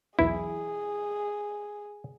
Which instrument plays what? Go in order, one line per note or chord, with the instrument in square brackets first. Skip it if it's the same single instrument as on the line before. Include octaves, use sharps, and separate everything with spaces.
[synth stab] B1 E2 E3 [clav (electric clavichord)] E4 [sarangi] G#4